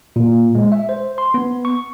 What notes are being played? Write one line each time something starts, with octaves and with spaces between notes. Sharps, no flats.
A#2
G#3
E5
C5
C6
B3
C#6